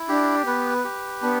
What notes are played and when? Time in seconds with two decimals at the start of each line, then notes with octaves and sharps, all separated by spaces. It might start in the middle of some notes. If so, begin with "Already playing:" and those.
Already playing: E4
0.08 D4 G4
0.46 B3 B4
0.84 G4
1.22 B3 D4